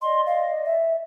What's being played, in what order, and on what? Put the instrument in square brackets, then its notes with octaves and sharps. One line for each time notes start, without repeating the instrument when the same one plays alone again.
[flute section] D5 D#5 [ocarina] C6
[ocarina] F5
E5